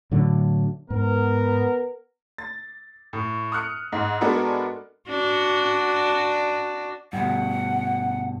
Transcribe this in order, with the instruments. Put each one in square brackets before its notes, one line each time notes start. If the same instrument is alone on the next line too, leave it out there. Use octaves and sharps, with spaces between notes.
[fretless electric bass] A2 D3 F#3
[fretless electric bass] G#2 [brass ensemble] B3 A#4
[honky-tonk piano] A6
A2
D#6 F6 F#6 C#7
G#2
G#3 B3 D4 F#4 A4 A#4
[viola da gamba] D4 F#4
[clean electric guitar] G2 B2 [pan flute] F#5